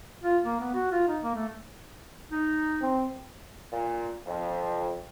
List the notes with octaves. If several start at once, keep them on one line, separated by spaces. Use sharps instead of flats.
F4
A#3
B3
F#4
F4
D#4
A#3
A3
D#4
C4
A#2
F2